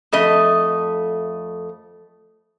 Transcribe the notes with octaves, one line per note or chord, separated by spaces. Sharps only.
F2 A3 D#5